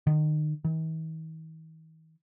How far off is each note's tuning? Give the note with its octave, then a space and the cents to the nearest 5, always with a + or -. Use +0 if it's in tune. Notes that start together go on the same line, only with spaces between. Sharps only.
D#3 -30
D#3 +45